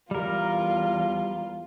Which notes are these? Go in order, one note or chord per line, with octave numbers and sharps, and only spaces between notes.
E2 G3 F4 A#4